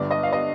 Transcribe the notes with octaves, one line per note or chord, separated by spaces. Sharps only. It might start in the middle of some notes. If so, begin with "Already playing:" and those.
Already playing: G1 G2 D3 D5
D#5
F5
D#5